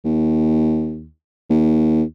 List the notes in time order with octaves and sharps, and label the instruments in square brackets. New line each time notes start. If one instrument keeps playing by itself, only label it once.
[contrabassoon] D#2
D#2